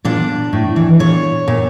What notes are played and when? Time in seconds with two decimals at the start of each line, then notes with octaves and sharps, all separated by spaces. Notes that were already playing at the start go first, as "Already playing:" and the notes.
0.05 A#2 D4
0.53 A2
0.76 E3
0.99 A#2 C#5
1.48 A#2